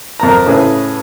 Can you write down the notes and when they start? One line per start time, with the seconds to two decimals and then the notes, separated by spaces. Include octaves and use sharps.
0.20 F2 A#4 A#5
0.46 A2 C#3 G#4 B4